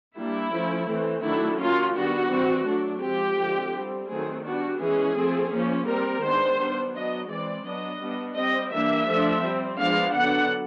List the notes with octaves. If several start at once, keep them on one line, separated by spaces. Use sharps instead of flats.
G3 A#3 D4 E4
F3 A3 C#4
E3 A3 C4
D#3 F#3 A3 D4 E4
F#3 A#3 C#4 F4
D#3 G3 B3 D4 F#4
E3 G3 C4
F#3 A3 D4
F3 G#3 C4 G4
D3 F3 G#3 C4
G3 C4
D#3 F#3 A3 C4 G#4
G3 B3 D4 F#4
E3 G#3 C#4 G#4
F3 A3 C4
F3 A#3 C#4
G3 C4 A#4
D#3 G#3 B3 D4 C5
G3 B3 D4
F#3 B3 D4 D#5
E3 G#3 C4 D5
F#3 B3 D4 D#5
G3 B3 D4
G3 C4 D#5
E3 G3 A#3 D4 E5
F3 A3 D4
G3 C4
F3 G#3 B3 D4 F5
D3 F#3 B3 D4 F#5